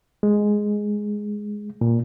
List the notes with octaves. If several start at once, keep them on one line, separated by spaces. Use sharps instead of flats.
G#3
A#2